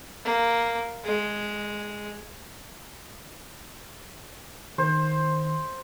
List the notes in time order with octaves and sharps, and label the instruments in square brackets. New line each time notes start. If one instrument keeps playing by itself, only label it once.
[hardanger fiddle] A#3
G#3
[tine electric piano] D#3 [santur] C5